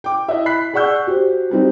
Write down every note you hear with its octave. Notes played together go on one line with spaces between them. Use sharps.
G5 D6
E4 D#5 E5
B5 F#6 B6 C7
G#4 D5 F#5 C#6 E6 G6
F#4 G4 C5
F#3 G3 C4 D#4